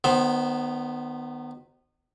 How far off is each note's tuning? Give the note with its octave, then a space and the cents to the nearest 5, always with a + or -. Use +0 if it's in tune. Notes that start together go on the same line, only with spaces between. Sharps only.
D#3 -30 B3 +0 C5 +10